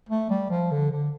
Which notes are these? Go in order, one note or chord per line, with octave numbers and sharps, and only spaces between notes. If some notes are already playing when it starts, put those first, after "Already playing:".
A3
G3
F3
D3
D3